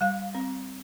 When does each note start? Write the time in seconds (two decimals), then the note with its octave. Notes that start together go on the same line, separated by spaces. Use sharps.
0.01 G3 F5
0.35 C4